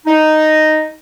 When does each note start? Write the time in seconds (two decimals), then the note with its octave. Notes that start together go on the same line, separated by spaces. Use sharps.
0.06 D#4